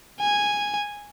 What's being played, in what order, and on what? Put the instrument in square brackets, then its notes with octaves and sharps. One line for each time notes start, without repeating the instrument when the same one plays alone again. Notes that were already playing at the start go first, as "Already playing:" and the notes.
[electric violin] G#5